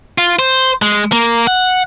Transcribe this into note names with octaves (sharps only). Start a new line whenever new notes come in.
F4
C5
G#3
A#3
F#5